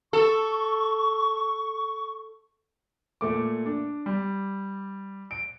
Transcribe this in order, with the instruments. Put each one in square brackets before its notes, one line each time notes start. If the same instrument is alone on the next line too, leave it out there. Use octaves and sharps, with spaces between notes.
[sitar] A4 [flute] C#6
[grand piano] A#2 A3 D6
D4
G3
D7